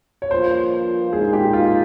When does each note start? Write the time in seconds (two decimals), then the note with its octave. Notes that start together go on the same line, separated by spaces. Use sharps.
0.22 C#5
0.31 G2 F3 A#3 F4 C5
1.13 A#2 G#3 D#4 G#4
1.33 G4
1.53 F4